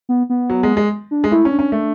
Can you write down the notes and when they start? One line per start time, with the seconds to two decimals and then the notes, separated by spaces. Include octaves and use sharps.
0.09 B3
0.30 B3
0.50 F#3
0.63 G#3
0.77 G#3
1.11 D4
1.24 G#3
1.31 A3 E4
1.45 C#4
1.52 D4
1.59 C#4
1.72 A3